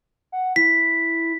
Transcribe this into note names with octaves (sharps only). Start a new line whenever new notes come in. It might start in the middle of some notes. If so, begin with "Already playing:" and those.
F#5
E4 B6